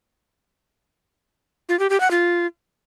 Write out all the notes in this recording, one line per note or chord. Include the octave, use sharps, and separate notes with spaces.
F4
G4
G4
F#5
F4